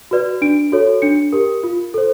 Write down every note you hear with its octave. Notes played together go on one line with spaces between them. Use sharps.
F#4 B4 D5
D4 D7
F#4 A4 C#5
D4 C#7
G4 A#4
F4
A4 C5